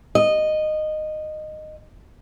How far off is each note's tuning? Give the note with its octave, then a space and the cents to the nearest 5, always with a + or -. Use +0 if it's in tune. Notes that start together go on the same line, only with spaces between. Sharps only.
D#5 -15